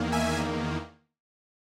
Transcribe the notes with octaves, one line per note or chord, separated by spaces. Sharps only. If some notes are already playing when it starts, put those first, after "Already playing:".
Already playing: E2 D#3 A#3
E5 G#5